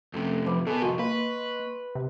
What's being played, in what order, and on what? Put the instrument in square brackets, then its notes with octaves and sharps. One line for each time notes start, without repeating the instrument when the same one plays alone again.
[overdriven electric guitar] F2 C3 [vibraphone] A3 C#4 A4
[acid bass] F3 [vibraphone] B4 B5 D6
[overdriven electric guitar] B2 B3 [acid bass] A4 [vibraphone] A#4 G#5 A5
[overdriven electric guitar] C2 F2 [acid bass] F#4 [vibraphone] D#5 C6 C#6
[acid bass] A#3 [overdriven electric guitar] B4
[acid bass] C3